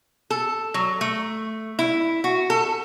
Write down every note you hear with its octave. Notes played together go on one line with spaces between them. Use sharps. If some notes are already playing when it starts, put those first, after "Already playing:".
A4
F#3
A3
E4
F#4
A4